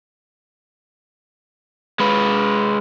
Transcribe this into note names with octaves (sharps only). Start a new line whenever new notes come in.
G#3 B4